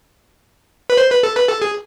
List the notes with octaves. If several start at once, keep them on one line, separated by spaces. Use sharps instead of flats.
B4
C5
B4
A4
B4
A4
G#4